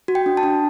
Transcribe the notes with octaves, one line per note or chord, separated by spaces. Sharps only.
F#4
G5
D4
A5
D4